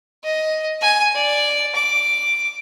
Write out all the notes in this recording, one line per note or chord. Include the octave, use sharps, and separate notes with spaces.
D#5
G#5
D5
D6